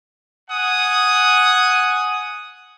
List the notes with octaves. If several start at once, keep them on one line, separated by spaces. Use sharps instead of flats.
F#5 G#5 D#6